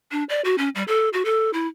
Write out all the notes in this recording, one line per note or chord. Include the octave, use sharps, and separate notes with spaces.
D4
D5
F#4
C#4
G3
A4
F#4
A4
E4